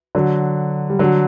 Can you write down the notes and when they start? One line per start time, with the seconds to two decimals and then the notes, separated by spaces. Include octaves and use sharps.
0.15 D3 F#3
0.89 G3
0.99 D3 F#3